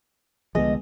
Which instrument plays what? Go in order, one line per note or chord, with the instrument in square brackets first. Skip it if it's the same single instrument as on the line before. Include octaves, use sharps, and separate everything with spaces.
[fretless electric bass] C2 D3 F3 [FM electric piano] G#3 B3 G#4 [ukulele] D#5